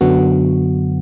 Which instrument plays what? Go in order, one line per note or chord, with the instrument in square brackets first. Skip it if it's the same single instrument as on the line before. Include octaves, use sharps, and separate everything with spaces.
[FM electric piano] F#2 D3 F#3 B3 F#4